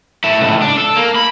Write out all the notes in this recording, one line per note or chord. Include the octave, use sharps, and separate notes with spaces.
A3 E4
C#2 A2
D4
A4
A#3
B5